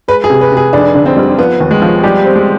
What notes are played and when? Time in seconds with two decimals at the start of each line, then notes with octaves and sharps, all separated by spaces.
0.08 G#3 B4
0.24 G#4
0.30 C3
0.41 B4
0.52 C3
0.57 G#4
0.73 F1 D4
0.95 D3
1.06 C4
1.17 G3
1.38 F3 B3
1.60 D#2
1.71 G#3
1.82 F3
2.03 G3 G4
2.25 C4
2.36 G#3